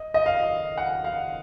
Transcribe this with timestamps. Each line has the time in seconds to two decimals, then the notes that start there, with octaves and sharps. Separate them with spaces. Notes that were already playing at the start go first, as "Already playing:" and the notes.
Already playing: D#5
0.14 D#5
0.26 F5
0.78 F#5
1.04 F5